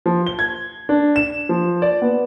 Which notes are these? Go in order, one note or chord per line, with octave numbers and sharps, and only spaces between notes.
F3
G7
G#6
D4
E7
F3
D5
B3